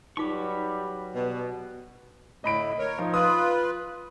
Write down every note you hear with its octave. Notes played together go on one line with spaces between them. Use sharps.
F#3 G3 D#4 F4 B4 C#6 D6
B2 G3
A2 D3 A3 D#5 B5 D7
A#4 C#5
F3 D#4
F4 B4 D#6